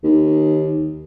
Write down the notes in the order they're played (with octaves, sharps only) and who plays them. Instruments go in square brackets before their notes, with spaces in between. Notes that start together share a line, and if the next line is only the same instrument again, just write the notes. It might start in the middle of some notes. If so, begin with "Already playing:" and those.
[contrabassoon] D#2